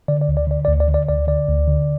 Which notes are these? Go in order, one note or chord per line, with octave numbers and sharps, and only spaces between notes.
D3 D5
D5
D2
D5
D3 D5
D5
D2
D5
D3
D5
D2 D5
D3 D5
D2
D3